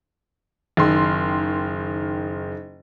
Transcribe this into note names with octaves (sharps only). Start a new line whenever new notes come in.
F#1 D#3 C6